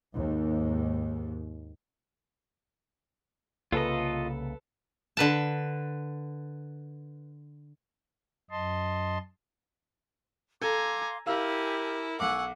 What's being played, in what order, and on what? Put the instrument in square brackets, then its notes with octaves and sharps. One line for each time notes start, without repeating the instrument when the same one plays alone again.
[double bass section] D#2 G#2
[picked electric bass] C2 C#3 A#3 [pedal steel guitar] F4 D#5 [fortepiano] A4 B4
[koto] D3 B4 A5
[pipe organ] F#2 D#5 A5 C6
[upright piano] A4 [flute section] F5 C6 D6 [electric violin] G#5 A#5
[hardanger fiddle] E4 [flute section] G4 G#5 [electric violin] A#4 [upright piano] F5 E6
[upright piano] B1 D6 [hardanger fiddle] F#5 [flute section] G#5 C#6 E6